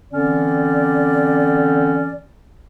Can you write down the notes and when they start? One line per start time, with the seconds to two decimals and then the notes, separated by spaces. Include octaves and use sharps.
0.12 D3 E3 C4 C#4 D5